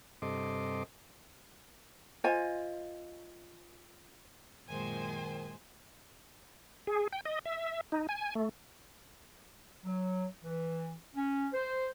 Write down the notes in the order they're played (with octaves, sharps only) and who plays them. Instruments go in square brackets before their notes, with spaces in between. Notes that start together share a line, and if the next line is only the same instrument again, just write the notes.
[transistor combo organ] G2 C3 A4 D#5 C6 D6
[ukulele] F4 C5 D#5 G#5
[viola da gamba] F#2 A#2 G#3 [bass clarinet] D#3 [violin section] C5 G#5
[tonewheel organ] G#4
G5
D#5
E5
D#4
G#5
A3
[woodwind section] F#3
E3
C#4
C5